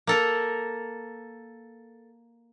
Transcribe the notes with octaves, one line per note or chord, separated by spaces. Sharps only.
A#3 A4 A#4